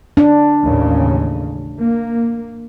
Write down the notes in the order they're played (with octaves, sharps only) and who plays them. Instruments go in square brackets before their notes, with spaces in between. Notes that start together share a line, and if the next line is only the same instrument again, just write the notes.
[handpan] D4
[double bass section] A1 D#2 C#3
A#3